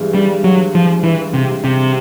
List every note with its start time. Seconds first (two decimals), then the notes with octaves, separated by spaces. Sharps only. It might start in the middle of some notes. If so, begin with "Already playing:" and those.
Already playing: G2 E3 G#3
0.14 G3
0.44 F#3
0.75 F3
1.03 E3
1.33 C3
1.64 C3